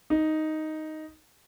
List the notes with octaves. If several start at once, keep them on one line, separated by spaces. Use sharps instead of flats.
D#4